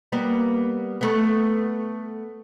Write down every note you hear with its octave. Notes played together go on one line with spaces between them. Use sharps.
G3 A#3 B3
A3 B3